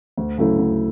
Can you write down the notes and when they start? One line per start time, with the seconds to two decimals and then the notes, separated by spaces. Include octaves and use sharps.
0.18 D2
0.38 C#3 F#3 A3 E4
0.59 D2